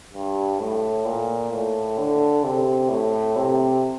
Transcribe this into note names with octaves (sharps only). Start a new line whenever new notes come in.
G2
A2
A#2
A2
D3
C3
A2
C3